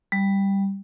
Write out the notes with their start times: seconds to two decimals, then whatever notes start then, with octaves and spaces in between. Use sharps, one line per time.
0.12 G3